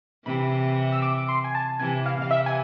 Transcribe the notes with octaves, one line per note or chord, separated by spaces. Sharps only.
C3 E3 B5
E6
D6
D6
C6
G#5
A5
C3 E3 G#5
F5
C3 E3 F5
E5
G#5